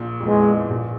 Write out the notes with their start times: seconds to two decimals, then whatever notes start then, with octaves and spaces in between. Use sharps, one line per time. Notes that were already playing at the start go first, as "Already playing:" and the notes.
Already playing: A#1 A#2
0.20 F2
0.26 E2 G#3
0.70 A#1 A#2